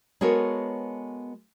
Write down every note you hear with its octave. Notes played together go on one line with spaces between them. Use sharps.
G#3 B3 F#4 A4 A#4 C#5